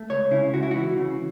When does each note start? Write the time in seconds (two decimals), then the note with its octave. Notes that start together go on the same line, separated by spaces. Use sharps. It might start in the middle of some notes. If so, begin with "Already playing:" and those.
Already playing: A3
0.10 C#2 C#5
0.31 C#3 E4
0.53 C#2 F#4
0.63 E4
0.71 E3 F#4
0.97 C#3